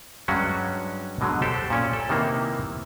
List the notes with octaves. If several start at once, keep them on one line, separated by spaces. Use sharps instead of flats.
G2 F#3 G#3 C#4 D4 F#4
B2 D3 F#3 G#3
G4 A4 C5
A#2 C#4 D5
A4
C3 D#3 E3 A#3 C4